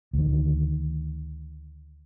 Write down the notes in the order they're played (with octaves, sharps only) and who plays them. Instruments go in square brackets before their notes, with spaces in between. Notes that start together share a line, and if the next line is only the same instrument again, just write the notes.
[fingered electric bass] D2 D#3